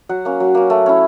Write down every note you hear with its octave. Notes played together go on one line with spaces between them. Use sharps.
F#3 F#5
A#3 C#4
F#3
A#3 C#4
A3
C#4 E4